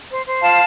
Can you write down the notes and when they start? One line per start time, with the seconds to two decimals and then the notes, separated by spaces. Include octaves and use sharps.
0.10 C5
0.27 C5
0.43 F4 F5 A5